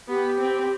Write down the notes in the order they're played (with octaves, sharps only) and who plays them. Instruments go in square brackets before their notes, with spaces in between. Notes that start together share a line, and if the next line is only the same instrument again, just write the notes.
[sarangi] B3 [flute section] G4
[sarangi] C4